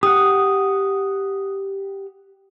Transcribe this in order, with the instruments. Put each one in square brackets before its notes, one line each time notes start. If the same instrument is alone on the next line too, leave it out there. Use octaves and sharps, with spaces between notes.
[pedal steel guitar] G4 F#5 [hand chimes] D#6